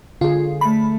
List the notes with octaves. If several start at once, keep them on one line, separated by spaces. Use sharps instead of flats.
D3 F4 G#4
A3 B5